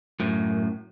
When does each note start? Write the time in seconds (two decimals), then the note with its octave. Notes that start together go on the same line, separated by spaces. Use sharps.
0.20 F#2 A2